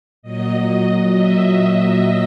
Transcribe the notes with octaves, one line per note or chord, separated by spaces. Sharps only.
A#2 F#3 D#5
E5